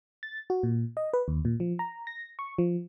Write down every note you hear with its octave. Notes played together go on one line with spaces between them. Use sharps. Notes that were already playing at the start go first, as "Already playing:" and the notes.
A6
F#4
A#2
D#5
B4
D#2
A#2
F3
A#5
A#6
C#6
F3